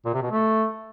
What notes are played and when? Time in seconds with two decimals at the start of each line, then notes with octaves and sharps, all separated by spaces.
0.05 A#2
0.14 C3
0.22 B2
0.31 A3